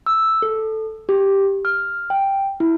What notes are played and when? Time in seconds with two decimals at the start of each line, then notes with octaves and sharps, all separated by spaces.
0.06 E6
0.42 A4
1.09 G4
1.65 F6
2.10 G5
2.60 E4